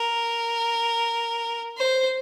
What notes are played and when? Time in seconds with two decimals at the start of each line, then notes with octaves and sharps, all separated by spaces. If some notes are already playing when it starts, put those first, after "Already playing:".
Already playing: A#4
1.78 C5